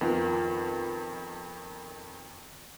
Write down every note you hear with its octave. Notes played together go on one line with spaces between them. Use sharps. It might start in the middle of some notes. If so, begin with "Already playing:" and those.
F2 D#3 B3 F4 A#4